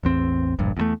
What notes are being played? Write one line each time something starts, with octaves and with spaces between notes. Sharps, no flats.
A1 E2 C4
E1 A#1 G2
E2 C3 A3